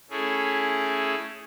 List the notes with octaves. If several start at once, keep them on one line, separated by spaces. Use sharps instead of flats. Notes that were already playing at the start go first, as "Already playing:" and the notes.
A3 C#4 E4 G#4